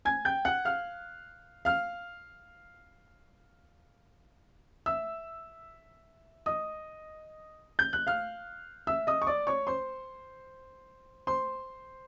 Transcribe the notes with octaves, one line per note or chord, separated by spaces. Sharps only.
G#5 G#6
G5 G6
F#5 F#6
F5 F6
F5 F6
E5 E6
D#5 D#6
G6
F#6
F5 F6
E5 E6
D#5 D#6
C#6
D5 D6
C#5 C#6
C5 C6
C5 C6